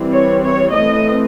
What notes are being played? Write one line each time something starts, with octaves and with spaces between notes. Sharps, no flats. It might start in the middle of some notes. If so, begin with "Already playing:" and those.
Already playing: E3 G3 C4
C#5
C#5
E3 A3 C4 D#5